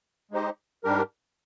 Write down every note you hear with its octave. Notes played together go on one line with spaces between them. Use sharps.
G#3 D#4 G4 C5 D#5
G#2 G3 D4 G4 A#4